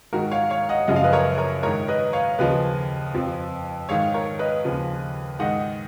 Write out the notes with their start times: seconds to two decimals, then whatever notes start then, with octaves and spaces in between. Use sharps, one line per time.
0.13 G#2 D#3 F#4 A#4
0.31 C#5 F5
0.50 C#5 F5
0.69 D#5 F#5
0.88 F#2 C#3 F3 D#5
0.96 F5
1.04 B4 D#5
1.13 A#4 C#5
1.38 A#4 C#5
1.63 G#2 D#3 A#4 C#5
1.88 B4 D#5
2.13 C#5 F5
2.39 D#2 C#3 F3 B4 D#5
3.14 F2 F3
3.89 G#2 D#3 C#5 F5
4.14 A#4 C#5
4.39 B4 D#5
4.65 D#2 C#3 F3
5.39 G#2 D#3 D#5 F#5